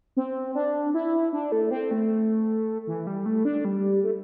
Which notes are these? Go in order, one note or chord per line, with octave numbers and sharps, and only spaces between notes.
C4
D4
E4
D4
A3
C4
A3
E3
G3
A3
D4
G3
A3